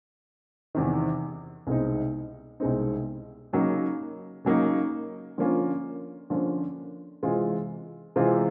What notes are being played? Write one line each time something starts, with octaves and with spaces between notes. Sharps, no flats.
E2 C3 D#3
C2 B2 G#3 C4 D#4
C2 B2 G#3 C4 D#4
C#3 F#3 A#3 D#4
C#3 F#3 A#3 D#4
D3 F3 A#3 C#4 F4
D3 F3 A#3 C#4 F4
C3 E3 G#3 C4 F4
C3 E3 G#3 C4 F4